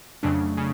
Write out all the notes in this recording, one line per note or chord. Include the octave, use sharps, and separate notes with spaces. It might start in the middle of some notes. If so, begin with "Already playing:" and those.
F2 C#3 F#3 A3 D4
C#3